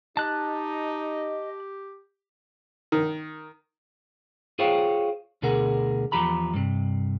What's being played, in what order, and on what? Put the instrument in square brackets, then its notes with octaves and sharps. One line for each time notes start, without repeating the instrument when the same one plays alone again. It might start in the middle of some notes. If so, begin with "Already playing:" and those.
[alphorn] D#4 [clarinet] G4 [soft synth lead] D#5 [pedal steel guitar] A5 F#6
[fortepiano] D#3
[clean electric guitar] F4 G#4 C5 C#5 F5 G5
D2 B2 D3 G#4 A#4 F#5
E2 F3 G4 A#5 B5
G2 C3